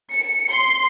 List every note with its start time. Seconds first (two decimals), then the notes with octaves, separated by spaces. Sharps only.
0.12 C#7
0.51 C6